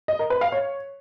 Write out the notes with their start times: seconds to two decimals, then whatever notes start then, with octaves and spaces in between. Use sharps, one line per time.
0.08 D#5
0.19 A#4
0.30 B4
0.41 F5
0.52 C#5